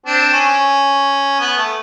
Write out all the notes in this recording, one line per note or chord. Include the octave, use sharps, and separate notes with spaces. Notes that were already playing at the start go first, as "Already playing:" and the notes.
C4 D4
C#4
B3
A3